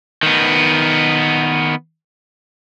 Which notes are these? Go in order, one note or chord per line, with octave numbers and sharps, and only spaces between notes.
D#3 B3